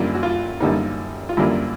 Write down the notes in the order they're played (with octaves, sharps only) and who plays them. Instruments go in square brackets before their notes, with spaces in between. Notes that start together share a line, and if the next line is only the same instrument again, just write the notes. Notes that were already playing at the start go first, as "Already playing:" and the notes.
Already playing: [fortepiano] F#2 D3 G3 A#3 E4 F4
F#4
F4
F#2 D3 G3 A#3 D#4
F4
F#2 D3 G3 A#3 E4